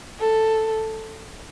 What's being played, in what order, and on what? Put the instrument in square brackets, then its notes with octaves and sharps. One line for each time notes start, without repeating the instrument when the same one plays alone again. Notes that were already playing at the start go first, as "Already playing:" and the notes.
[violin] A4